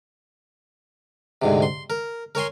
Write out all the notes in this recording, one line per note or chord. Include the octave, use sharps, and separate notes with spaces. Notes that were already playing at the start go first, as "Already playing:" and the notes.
D2 G#2 C3
C6
A#4
A#4 C#5 G#5 C6